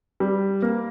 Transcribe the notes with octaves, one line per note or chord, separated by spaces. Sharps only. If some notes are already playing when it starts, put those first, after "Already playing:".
G3
A#3